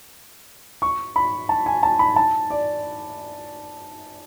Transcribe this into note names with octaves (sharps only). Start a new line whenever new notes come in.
C#6
B5
A5
G#5
A5
B5
A5
D5